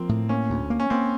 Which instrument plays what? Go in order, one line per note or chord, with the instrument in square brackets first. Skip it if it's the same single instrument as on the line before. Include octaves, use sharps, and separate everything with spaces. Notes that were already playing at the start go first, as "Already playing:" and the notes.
Already playing: [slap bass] F3 [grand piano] A#3 C4
[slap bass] A2
[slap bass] A#3 [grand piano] C#4
[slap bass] D2
A#3
[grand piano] C#4
[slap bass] A#3 [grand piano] C4